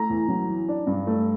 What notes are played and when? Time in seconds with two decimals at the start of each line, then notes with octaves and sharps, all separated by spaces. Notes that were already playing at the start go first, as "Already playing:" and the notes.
Already playing: A3 A#5
0.10 E2
0.28 F#3
0.49 E3
0.68 D4
0.87 G2
1.07 A3